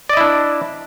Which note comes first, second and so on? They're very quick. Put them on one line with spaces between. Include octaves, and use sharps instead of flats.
D5 D#5 E4 D4